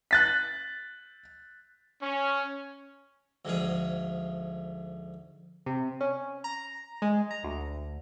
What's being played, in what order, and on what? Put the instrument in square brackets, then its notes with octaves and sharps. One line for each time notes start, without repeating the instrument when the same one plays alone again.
[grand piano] F#6 A6 B6
[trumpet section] C#4
[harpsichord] D2 G#2 F3 G#4
[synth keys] C3
C#4
A#5
G#3
A#5
D2